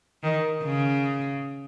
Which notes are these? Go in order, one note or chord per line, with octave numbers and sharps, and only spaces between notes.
D#3
C#3